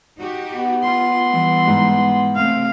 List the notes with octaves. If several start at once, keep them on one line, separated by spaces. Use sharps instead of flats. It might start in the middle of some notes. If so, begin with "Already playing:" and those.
D#4 F#4 G4
B3
F4 C6
E3 G3
G#2
C3 A3 C4 F5